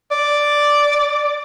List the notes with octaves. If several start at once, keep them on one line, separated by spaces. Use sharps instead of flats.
D5